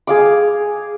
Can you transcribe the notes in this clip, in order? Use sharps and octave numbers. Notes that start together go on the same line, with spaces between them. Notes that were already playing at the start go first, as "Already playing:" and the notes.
G#4 F5 D6